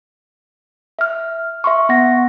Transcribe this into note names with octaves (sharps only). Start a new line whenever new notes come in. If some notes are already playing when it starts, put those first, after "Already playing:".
E5 F6
E5 C6 C#6
B3 F#5 A#6